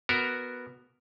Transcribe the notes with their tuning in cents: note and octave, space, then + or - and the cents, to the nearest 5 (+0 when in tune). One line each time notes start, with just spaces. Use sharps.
B3 +0 F#4 +0 A#4 +0